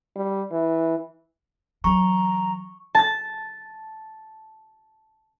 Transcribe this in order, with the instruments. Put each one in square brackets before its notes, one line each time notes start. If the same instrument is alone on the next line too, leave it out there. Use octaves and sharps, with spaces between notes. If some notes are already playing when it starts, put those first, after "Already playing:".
[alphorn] G3
E3
[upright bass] E3 F#3 [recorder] A#5 [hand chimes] C#6
[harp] A5 A6